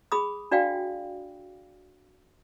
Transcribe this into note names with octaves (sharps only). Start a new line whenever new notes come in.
G#4 B5 D#6
D4 F#4 D5 F5 G5